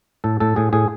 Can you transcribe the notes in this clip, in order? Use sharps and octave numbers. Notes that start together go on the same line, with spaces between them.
A2 A4
A2 A4
A2 G#4
A2 G#4